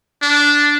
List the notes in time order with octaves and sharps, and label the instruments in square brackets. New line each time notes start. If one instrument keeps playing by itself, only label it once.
[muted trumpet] D4